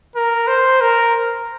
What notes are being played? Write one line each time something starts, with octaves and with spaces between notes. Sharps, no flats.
A#4
C5
A#4